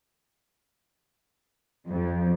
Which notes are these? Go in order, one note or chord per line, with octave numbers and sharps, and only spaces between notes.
F2